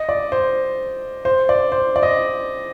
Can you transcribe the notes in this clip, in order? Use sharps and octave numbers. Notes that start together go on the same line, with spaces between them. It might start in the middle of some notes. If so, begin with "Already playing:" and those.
Already playing: D#5
D5
C5
C5
D5
C5
D5
D#5